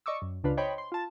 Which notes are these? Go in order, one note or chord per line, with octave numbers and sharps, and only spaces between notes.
D5 D#5 C#6 D6 E6
F#2
C#2 C#3 D4 F4 B4 F5
C5 C#5 D#5 G5 B5 C6
C6
F4 A5